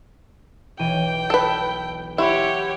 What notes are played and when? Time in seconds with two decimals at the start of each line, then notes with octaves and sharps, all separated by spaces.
0.79 B1 E3 G5 D#7
1.30 A4 B4
2.18 E4 G4 C#5 F#5 C6 C#6